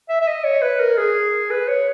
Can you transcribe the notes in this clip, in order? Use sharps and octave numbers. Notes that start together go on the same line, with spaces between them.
E5
E5
D#5
C#5
B4
A#4
G#4
B4
C#5